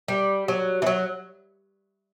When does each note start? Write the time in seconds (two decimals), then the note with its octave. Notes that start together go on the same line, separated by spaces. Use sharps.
0.08 G3
0.48 F#3
0.82 E3
0.87 F#3